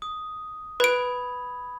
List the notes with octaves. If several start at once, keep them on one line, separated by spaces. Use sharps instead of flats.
D#6
B4 B5 G#6 D7